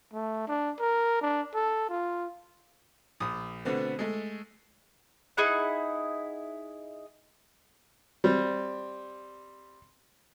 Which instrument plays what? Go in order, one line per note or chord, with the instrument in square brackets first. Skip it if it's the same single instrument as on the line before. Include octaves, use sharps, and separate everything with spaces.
[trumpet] A3
D4
A#4
D4
A4
F4
[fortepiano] A#1 D#6
B2 D3 A3 B3 C4
G#3 A3
[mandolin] D#4 E4 G#4 F#5
[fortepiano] G3 C4